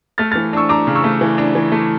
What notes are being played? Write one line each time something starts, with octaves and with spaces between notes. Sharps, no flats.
A3 F6 A6
F6 A6
E3
D4 C#6 E6
D4 A#5 D6
C#3
C#6 E6
A3
E3
D4
E3
A3